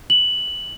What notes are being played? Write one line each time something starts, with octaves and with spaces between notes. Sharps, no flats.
F#7